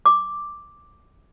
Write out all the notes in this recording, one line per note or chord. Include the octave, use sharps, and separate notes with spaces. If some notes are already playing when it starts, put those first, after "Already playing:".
D6